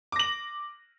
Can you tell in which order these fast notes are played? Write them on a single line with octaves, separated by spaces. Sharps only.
D6 A#6 F#7